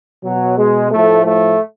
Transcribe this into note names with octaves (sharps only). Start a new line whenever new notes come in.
B2 F#3
G#3
A2 F3 A3
A3